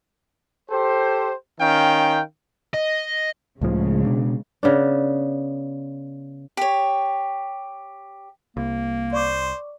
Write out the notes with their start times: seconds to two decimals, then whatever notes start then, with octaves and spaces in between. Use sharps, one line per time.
0.70 G4 A4 C5
1.60 D#3 C#4 F5 G5
2.74 D#5
3.61 C#2 A2 C#3 F3 G#3
4.06 B2 D4
4.63 C#3 B3 D4
6.57 G4 C#5
8.57 C2 A#3
9.13 C5 D5 C#6 D6